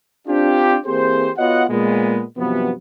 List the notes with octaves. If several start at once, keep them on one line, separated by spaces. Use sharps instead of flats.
C4 D4 F4 G4
E3 A#3 C4 G4 G#4 C5
B3 F4 F#4 C#5 D#5 F#5
A#2 G#3 B3
G2 C3 F3 F#3 B3